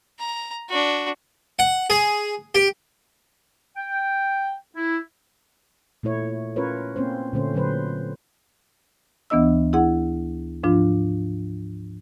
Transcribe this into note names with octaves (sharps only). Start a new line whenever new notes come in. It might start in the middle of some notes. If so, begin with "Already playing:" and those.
A#5
D4 F#4
F#5
G#4
G4
G5
E4
A#2 A3 E4 C#5
C#4 F4 A#4 B4 C#5
A#3 C4 C#4 C5
A#2 D3 A3 C#4 C5
A#2 D3 F#3 B4 C5
D2 E3 B3 D4 D#5 E6
E4 G#4 F#5
G#2 F3 D4 F4